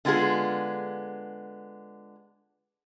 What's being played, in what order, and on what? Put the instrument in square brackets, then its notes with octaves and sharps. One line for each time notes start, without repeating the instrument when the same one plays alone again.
[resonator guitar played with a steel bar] D3 G#3 B3 F4 G#4